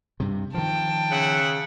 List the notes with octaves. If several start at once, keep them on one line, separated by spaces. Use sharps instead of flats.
G2 C3
D#3 F3 G5 A5
C#3 G#4 E5 F#5